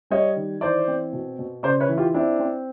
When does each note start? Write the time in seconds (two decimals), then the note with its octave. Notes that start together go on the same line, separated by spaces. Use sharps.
0.10 G3 C#5 D#5
0.36 D#3
0.61 E3 C5 D5
0.88 C4
1.13 B2
1.39 B2
1.63 C#3 C5 D5
1.80 B4 C#5
1.89 E3
1.98 F4 G4
2.14 C4 D4 E4
2.40 C4